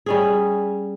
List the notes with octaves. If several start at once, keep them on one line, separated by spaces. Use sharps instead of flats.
G3 C#4 G#4